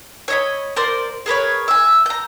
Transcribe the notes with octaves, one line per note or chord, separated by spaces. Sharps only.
C#5 D#5 B5
A#4 C5 D5
G#4 A#4 B4 C#5
E5 G#5
A#5 G6